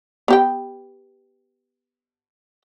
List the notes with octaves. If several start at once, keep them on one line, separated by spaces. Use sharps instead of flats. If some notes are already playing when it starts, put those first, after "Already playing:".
B3 G4 G5